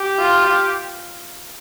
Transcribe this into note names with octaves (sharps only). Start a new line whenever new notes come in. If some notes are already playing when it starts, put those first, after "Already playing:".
Already playing: G4
F4